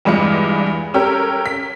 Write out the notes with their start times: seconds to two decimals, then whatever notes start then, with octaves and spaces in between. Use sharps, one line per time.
0.05 E2 G2 G#3 F4 C#7
0.94 C#4 G4 A4 A#4
1.46 B6